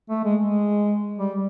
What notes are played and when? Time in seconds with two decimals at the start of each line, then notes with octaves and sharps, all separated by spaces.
0.10 A3
0.25 G#3
0.41 G#3
1.18 G3